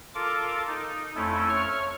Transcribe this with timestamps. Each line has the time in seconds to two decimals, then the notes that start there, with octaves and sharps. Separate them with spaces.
0.15 F4 A4 A#4 D6
0.67 D#4
1.16 F2 A3 C#4 E4 A4
1.49 C#5 C#6 F6